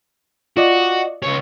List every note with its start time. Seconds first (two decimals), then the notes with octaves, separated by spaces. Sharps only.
0.57 F4 F#4 D5 D#5
1.23 C#2 C#5